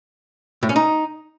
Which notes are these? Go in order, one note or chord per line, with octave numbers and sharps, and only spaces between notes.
A2
C#4
D#4